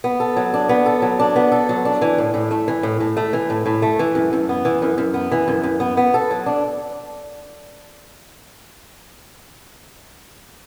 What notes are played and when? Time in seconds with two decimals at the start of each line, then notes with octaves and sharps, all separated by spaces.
0.04 B3
0.20 A4
0.36 F#3
0.54 D4
0.69 B3
0.86 A4
1.02 F#3
1.19 D4
1.36 B3
1.52 A4
1.69 F#3
1.85 D4
2.02 E3
2.18 A2
2.34 A2
2.51 A3
2.68 E3
2.83 A2
3.00 A2
3.17 A3
3.33 E3
3.50 A2
3.66 A2
3.82 A3
3.99 E3
4.15 F#2
4.33 F#2
4.49 B3
4.65 E3
4.82 F#2
4.98 F#2
5.14 B3
5.32 E3
5.48 F#2
5.63 F#2
5.80 B3
5.97 B3
6.14 A4
6.30 F#3
6.46 D4